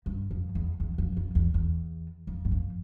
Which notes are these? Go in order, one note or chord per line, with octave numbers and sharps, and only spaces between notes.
G2
F2
E2
E2
F2
F2
E2
E2
F2
G2
F2